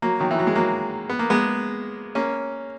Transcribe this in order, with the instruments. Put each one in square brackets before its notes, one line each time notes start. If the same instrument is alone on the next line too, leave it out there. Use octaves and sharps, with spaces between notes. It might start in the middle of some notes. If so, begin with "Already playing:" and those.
[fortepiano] F#3 A#3
D#3 F#3
E3
F#3
G#3
F#3 A#3
B3
A#3
G#3 B3
A#3 C#4